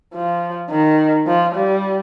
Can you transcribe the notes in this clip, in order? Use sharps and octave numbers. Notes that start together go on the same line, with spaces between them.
F3
D#3
F3
G3